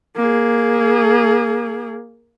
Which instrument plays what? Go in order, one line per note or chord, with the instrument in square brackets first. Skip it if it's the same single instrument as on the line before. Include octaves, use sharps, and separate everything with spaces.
[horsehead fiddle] A#3 G#4